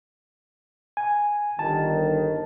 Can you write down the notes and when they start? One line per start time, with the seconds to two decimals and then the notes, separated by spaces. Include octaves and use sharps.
0.97 G#5
1.59 G1 D#3 A5